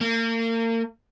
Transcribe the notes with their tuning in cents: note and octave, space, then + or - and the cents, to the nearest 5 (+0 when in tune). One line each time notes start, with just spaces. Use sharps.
A#3 -35